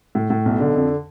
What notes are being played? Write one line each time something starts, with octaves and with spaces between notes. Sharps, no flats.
A2
A2
B1
D3
F2